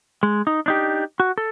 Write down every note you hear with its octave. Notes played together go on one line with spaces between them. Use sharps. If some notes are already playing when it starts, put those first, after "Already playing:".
G#3
D#4
D4 D#4 G4
F#4
A4